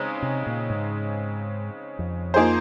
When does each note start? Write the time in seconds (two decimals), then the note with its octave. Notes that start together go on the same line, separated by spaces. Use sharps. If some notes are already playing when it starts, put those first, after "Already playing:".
Already playing: C#3 G#3 C4 D#4
0.22 C3
0.47 A#2
0.70 G#2
1.99 F2
2.34 F3 A#3 D#4 G#4 C5